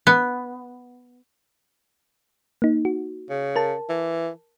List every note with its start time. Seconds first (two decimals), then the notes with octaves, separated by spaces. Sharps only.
0.07 B3
2.62 A#3 D#4
2.85 F#4
3.30 C#3
3.56 A#4 A5
3.89 E3